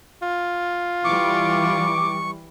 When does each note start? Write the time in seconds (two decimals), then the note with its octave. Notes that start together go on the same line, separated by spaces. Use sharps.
0.22 F4
1.04 E3 G3 C#6 D6